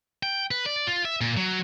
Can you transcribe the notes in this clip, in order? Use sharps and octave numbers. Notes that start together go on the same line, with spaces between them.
G5
B4
D5
F4
E5
A#2
F#3